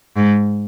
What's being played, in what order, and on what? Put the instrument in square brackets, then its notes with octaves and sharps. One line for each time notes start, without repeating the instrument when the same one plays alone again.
[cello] G#2